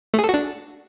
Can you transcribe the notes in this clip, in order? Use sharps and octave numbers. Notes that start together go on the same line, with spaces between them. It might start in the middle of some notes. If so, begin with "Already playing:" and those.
A3
G#4
A4
F#4
D4